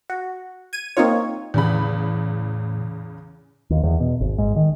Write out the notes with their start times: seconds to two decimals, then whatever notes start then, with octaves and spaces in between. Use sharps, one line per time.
0.10 F#4
0.73 G#6 D#7
0.97 A#3 C4 D#4 F4 C#5
1.54 E2 A2 C#3 B5
3.70 D#2
3.83 E2
4.00 B2
4.21 G#1
4.38 G#2
4.56 D#3